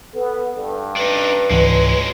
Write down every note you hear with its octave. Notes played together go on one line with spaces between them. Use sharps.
B3 A4
G2 A4
D4 D#4 B4
C#2 G#2 E3 F#3 G#3